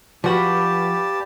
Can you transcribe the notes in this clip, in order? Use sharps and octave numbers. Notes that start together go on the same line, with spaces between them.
F3 F#4 G4 B4 D5 F5 A5 B5